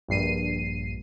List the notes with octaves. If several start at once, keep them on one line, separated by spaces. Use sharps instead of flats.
A#1 G2 C7 D#7